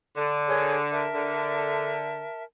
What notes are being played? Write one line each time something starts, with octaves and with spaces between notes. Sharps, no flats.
D3
G#4 A#4 C#5
A#4 E5 A5
D3